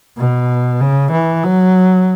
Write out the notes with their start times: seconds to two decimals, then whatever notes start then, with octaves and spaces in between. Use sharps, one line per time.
0.18 B2
0.81 C#3
1.12 E3
1.44 F#3